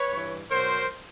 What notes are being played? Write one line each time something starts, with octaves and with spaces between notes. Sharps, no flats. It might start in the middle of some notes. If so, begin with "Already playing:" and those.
Already playing: B4 C#5
G2 E3
B2 F#3 A#4 C5